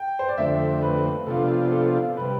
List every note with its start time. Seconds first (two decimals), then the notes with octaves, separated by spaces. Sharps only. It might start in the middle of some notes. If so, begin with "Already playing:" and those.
Already playing: G5
0.19 C5
0.28 D5
0.37 F2 D3 A3 C4 E5
0.82 B4
1.26 C3 F3 B3 D4 F4 A4
1.71 A4
2.17 C3 G3 B4